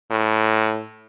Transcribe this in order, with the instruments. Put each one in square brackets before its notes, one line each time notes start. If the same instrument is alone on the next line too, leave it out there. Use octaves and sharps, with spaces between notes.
[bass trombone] A2